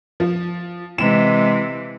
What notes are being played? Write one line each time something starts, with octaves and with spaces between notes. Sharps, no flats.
F3
C3 E3 G#3 E7